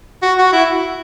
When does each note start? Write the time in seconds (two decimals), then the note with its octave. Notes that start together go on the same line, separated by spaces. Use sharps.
0.22 F#4
0.38 F#4
0.53 E4